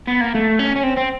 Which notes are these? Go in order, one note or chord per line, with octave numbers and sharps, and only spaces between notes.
B3
A#3
A3
C#4
C#4
C4
C4